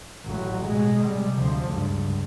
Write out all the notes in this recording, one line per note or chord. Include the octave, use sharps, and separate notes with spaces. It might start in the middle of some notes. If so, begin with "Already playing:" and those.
A1 F#3
B2 G#3
C3 G3
D2 F3
C#2 G2